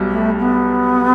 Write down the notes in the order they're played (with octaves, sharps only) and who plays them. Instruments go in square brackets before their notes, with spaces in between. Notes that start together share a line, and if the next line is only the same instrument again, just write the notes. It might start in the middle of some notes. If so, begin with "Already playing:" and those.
Already playing: [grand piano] B1 B2 G3
[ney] A3
B3